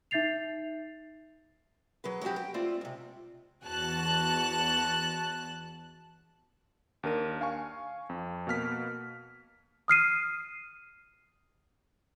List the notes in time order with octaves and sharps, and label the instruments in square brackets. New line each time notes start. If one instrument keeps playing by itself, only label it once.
[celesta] D#4 E5 G6 A6 C7 F7
[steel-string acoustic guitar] F#3 G#4 B4
F#3 G#3 C4 F#4 G4
G5
A3 C4 F4 D5
G#2 C3
[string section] E2 F#4 A5 F#6
[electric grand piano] D#2 D4 A#4 D#7
F5 G#5 C#6
F2
B2 A#3 F6 B6
[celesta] D#6 F6 C7 D#7